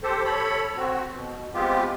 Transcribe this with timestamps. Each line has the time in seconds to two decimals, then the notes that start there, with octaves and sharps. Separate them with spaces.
0.03 G4 A4 C5
0.25 A4 C#5 B5
0.77 C4 F#4
1.11 B2
1.54 G#3 B3 C4 F4 G4